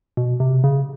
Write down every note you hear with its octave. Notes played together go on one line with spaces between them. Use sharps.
B2
C3
C#3